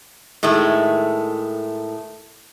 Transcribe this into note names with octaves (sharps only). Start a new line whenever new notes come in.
A2 D#3 G#3 A3